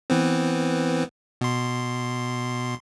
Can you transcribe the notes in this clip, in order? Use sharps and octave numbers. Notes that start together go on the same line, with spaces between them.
E3 B3 C4
B2 C6